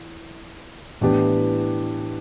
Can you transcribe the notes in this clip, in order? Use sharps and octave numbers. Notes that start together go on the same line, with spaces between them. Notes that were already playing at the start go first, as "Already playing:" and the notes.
Already playing: E3
A2 E3 B3 D4 G4